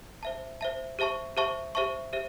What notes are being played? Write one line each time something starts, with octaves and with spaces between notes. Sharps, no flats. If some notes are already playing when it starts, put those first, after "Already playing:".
C5 E5 A5
C5 E5 A5
G4 C5 E5 A5 C#6
G4 C5 E5 A5 C#6
G4 C5 E5 A5 C#6
G4 C5 E5